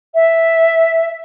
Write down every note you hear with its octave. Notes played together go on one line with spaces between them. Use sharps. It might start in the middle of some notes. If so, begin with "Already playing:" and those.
E5